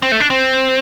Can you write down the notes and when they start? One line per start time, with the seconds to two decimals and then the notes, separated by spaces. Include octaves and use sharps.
0.02 C4
0.12 A3
0.20 D4
0.30 C4